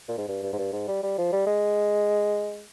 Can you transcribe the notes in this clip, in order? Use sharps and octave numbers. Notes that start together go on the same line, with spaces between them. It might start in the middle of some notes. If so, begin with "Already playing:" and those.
A#2
G#2
G2
G2
G#2
G2
G#2
G3
G3
F3
G3
G#3